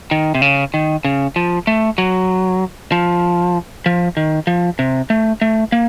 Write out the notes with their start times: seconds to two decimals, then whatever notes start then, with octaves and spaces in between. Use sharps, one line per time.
0.11 D#3
0.35 C3
0.42 C#3
0.74 D#3
1.05 C#3
1.36 F3
1.67 A3
1.98 F#3
2.92 F3
3.86 F3
4.17 D#3
4.47 F3
4.79 C3
5.10 A3
5.41 A3
5.72 A#3